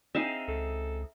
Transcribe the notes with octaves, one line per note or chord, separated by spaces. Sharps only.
C4 D#4 G#4 E5 F5
C#2 A4